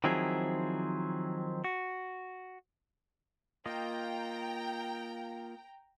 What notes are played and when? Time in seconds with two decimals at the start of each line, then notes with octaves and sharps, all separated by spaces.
0.04 D#3 F3 F#3 C4 E4 G#4
1.64 F#4
3.66 A#3 F4 D#5 G5 A#5